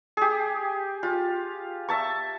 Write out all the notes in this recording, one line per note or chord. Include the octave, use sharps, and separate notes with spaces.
G4 G#4
F4
E5 A5 C#6